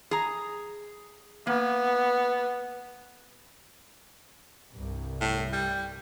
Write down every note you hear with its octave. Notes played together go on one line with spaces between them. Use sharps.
G#4 A#5
A#3 B3
C2 G2
A2
G3